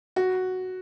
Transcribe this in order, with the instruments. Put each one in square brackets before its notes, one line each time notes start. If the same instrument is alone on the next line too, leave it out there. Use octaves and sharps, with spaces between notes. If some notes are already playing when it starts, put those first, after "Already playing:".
[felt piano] F#4